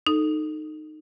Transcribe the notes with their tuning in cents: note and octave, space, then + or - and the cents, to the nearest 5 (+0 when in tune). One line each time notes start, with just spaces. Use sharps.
D#4 -15 A4 +0